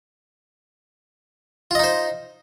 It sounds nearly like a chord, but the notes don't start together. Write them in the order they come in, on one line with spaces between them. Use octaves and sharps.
F4 D#5 D#4 C5